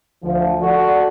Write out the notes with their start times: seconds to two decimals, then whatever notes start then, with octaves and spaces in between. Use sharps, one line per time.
0.22 D2 F3
0.61 F#4 A4 D5